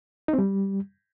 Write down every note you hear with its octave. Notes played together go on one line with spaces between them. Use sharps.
D#4
C4
G3